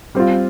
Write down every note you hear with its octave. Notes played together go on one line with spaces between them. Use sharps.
G3 C4 F4